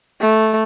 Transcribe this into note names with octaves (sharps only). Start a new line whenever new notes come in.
A3